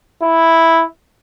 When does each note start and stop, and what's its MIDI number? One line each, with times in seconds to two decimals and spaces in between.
0.23 0.84 64